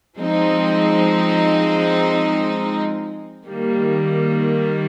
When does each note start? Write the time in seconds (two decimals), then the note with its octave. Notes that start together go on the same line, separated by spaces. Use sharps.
0.17 F3 G#3 C4 D#4
3.48 D#3 G3 A#3